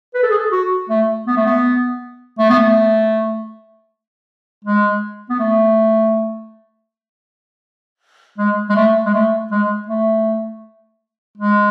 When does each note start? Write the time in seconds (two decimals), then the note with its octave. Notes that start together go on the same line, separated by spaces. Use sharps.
0.15 B4
0.23 A4
0.30 G#4
0.39 A4
0.52 F#4
0.89 A3
1.27 B3
1.37 A3
1.46 B3
2.39 A3
2.49 B3
2.59 A3
4.64 G#3
5.30 B3
5.39 A3
8.38 G#3
8.69 G#3
8.75 A3
9.06 G#3
9.14 A3
9.51 G#3
9.88 A3
11.37 G#3